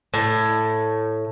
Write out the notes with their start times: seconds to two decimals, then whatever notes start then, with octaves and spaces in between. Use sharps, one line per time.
0.14 A2